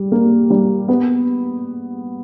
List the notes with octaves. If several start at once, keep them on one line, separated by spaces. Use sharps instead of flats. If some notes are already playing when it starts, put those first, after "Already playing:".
Already playing: G3
A#3
G3
B3